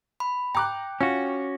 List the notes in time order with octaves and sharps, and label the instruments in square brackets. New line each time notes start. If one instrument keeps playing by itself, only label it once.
[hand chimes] B5
[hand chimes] G5 [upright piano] A#5 D6 F#6
[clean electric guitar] C#4 F#4 [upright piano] F4